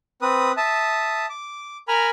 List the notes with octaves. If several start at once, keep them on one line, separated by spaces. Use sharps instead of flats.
C4 B4 D#6
E5 A5 D#6
D6
A#4 G#5 A#5 B5 F6